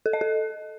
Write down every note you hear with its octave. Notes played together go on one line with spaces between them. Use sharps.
A4
D#5
A4